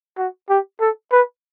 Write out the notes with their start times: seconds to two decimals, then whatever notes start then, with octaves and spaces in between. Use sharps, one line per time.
0.18 F#4
0.50 G4
0.80 A4
1.12 B4